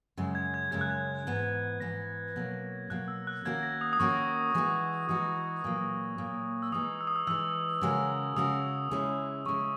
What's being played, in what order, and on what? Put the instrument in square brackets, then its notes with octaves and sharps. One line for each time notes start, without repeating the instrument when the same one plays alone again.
[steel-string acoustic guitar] F#2 C#3 G#3
[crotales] G#6
G#6
[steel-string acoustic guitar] F#2 C#3 G#3 [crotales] G#6
[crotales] F#6
G#6
[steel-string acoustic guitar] G#2 E3 B3
[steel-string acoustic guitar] G#2 E3 B3 [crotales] A#6
[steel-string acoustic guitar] B2 F#3 A#3
[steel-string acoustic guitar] B2 F#3 A#3 [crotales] F#6
[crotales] E6
F#6
[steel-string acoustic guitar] D#3 A#3 C#4 F#4 A#4 [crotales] G#6
[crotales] A#6
D#6
D#6
[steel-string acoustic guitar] D#3 A#3 C#4 F#4 A#4 [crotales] C#6
[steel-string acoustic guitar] E3 G#3 D#4 F#4
[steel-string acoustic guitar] E3 G#3 D#4 F#4 [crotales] D#6
[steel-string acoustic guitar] A#2 F#3 A#3
A#2 F#3 A#3
[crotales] E6
[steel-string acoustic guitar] E3 G#3 D#4 [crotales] D#6
[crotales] E6
D#6
E6
[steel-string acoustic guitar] E3 G#3 D#4 [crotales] E6
[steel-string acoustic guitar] C#3 G#3 C#4 F#4 A#4
[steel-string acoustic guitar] C#3 G#3 C#4 F#4 A#4 [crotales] D#6
[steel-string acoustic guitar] C#3 G#3 C#4 E4
[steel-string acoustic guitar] C#3 G#3 C#4 E4 [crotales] C#6